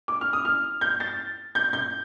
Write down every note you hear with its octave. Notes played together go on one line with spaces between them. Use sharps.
D6
F6
D#6
F6
G6
A6
G6
G6